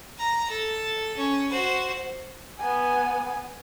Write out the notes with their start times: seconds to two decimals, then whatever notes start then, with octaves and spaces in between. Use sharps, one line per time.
0.18 A#5
0.50 A4
1.17 C#4
1.50 F#4 C5
2.58 B3 G#5